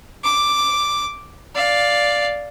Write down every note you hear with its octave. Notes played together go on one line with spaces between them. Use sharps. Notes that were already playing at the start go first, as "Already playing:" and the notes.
D6
D5 F5